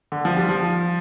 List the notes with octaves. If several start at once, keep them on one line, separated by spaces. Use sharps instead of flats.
D3
F3
G3
F3